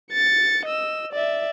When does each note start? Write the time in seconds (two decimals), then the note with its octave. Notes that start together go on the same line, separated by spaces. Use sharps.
0.13 A6 C#7
0.65 D#5 E6
1.13 D5 E5